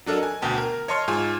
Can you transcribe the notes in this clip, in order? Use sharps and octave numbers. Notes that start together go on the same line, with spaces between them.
F#3 D4 A4 A#4 D#5
G#5
D2 B2 G5 A5
A#4
C#5 D#5 A5 C6 C#6 F6
G#2 F4 G#5